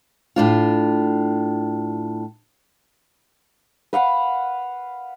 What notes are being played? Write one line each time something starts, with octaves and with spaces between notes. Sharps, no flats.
A2 D4 F4
B4 F5 F#5 B5